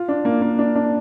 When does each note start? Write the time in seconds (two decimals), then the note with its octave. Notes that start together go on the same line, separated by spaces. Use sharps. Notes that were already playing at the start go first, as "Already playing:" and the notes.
Already playing: F4
0.08 D4
0.25 A#3
0.42 A#3
0.59 D4
0.76 D4